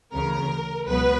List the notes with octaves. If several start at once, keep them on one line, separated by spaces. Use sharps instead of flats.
D2 C#3 E3 A#4
C#2 B2 F#3 B3 B4